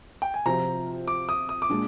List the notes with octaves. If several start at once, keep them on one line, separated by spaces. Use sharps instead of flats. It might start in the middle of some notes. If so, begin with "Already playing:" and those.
G5
G#5
C3 F3 C4 F4 A#5
D6
D#6
D#6
D6
A#2 G#3 D4